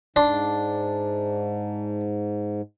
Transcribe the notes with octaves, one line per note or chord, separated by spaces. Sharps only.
G#2 D4 C6